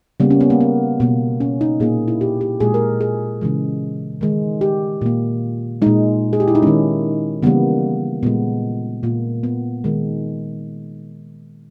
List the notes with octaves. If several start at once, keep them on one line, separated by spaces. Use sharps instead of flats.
C#3 G3 A#3 B3
C#4
B3
A#3
B3
B2 A#3
C#4
D#4
A#2 A#3 G#4
E4
G4
G4
A#2 G#3 G#4
A#4
G#4
C#3 E3 G#3
D#3 G#3
G4
A#2 A#3
A#2 G#3 D#4
G#4
G4
E4
D#4
D#3 G#3 C#4
C#3 E3 G3 A#3 B3
A#2 G#3 B3
A#2 A#3
B3
D#3 G#3